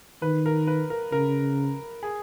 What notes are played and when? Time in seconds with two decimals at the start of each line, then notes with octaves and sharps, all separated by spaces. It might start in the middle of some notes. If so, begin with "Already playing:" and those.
0.22 D#3 B4
0.46 A#4
0.67 B4
0.90 A#4
1.12 C#3 A#4
2.03 G#4